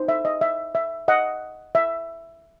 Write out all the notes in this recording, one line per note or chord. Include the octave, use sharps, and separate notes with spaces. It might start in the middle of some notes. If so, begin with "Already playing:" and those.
Already playing: D#4 C5
E5
D#5
E5
E5
D#5 F#5
E5